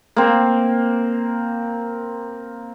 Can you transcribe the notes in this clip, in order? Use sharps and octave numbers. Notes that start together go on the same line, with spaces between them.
A#3 C4